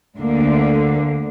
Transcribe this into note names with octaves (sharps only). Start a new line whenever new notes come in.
D2 D3 A#3